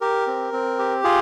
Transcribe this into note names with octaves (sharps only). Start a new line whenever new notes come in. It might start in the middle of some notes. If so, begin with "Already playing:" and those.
G4 A#4
C4
C4
G4
F4 G#4